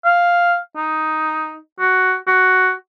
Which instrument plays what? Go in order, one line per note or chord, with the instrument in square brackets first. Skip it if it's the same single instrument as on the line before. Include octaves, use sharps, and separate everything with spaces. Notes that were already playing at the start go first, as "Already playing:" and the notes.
[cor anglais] F5
D#4
F#4
F#4